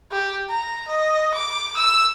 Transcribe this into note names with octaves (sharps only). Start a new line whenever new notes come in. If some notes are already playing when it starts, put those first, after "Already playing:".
G4
A#5
D#5
D6
E6